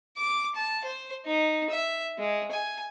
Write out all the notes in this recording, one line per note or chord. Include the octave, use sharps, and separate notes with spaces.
D6
A5
C5
D#4
E5
G#3
G#5